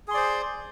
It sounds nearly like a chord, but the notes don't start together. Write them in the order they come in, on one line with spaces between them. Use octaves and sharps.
G#4 C6 D5 C5